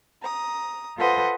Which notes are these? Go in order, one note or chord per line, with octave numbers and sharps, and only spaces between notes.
A#5 D#6
F4 A4 B4 C5 D#5 F#5